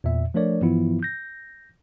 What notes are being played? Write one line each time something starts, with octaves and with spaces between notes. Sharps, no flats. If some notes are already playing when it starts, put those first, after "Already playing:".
E2 A#2 E5
F3 A3 D4 A#4 C#5 D5
G2 E3 F3 B3 E4 F4
G6 A#6